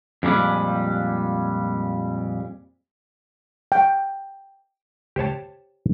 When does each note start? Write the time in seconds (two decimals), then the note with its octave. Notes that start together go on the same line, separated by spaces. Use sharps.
0.23 F2 A#2 G3 G#3
3.72 G5
5.16 G4 C5 C#5 A5